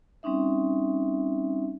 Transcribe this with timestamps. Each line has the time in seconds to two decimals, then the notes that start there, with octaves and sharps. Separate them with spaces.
0.23 G3 C4 C#4 D#4 E5